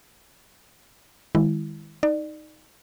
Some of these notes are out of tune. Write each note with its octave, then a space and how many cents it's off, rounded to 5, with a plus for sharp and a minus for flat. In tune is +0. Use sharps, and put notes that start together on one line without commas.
D#3 +0 G#3 -25 E4 +0
D#4 +0 D5 +25